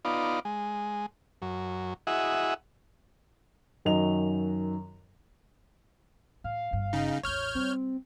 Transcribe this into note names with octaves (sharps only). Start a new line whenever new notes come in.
B3 D#4 F4 D5
G#3
F#2
E4 F#4 G#4 D#5 E5 F#5
F#2 D#3 F#3 D#5 F7
A2 F5
G1 G2
C#3 D#4
A1 E2 C#5 F6 G6
G3 C4